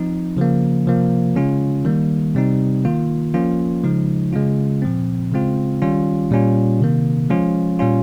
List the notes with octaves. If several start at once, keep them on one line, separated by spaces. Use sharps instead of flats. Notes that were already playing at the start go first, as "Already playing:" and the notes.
Already playing: F3 C4 D#4
C#3 F3 A#3
C3 F3 A#3
C#3 G#3 C#4 F4
D#3 G3 A#3
C3 G3 C4 D#4
D#3 A#3 F4
F3 A#3 C#4 F4
C#3 F3 G#3 D#4
C#3 G#3 C#4 F4
A#2 F3 C4
C#3 G#3 C4 F4
D#3 G3 C#4 F4
A#2 G3 C#4 F4
C3 D#3 A#3
F3 G#3 C#4 F4
A#2 G3 C#4 F4